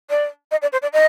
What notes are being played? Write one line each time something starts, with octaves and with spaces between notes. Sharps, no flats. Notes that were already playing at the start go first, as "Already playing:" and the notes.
D5
D#5
D5
C5
D5
D#5